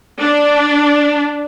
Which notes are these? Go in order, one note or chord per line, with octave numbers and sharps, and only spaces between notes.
D4